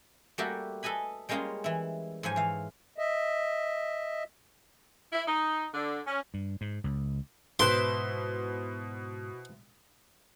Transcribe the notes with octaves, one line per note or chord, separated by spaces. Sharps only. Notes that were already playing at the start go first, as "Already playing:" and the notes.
G3 A3 A#3 F#4 G4 A4
A4 B4 D#5 G#5 B5
G3 G#3 A#3 C#4 F4 G#4
E3 E4
G#2 F3 C#5 G#5
E3 F5
D#5 E5
E4
D#4
D3
C#4
G2
G#2
C#2
G#2 B2 E4 B4 C5 C6